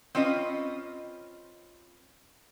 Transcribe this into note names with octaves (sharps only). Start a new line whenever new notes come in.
C4 C#4 F4 B4 D#5